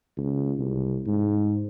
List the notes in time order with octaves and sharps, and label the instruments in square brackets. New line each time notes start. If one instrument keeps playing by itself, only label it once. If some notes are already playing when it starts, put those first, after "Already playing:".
[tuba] C#2
C2
G#2